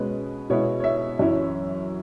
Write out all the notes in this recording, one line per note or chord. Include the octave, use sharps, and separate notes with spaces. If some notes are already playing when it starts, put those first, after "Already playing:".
Already playing: B2 G#3 C#4 B4
B2 G#3 B3 E4 C#5
C#5
E5
F#2 E3 C#4 E4